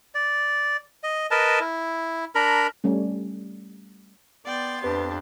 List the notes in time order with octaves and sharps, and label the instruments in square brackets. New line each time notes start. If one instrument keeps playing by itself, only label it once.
[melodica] D5
D#5
A#4 B4 D#5 A5
E4
D4 A#4 A#5 B5
[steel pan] G3 A3 C#4
[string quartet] B3 C6 A6 [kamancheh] D5 G5
[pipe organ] F2 [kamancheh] D4 G4 [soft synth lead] B4